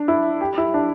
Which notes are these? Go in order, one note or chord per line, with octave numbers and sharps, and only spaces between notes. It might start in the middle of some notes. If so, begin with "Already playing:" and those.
Already playing: D4
E4
G4
E4
D4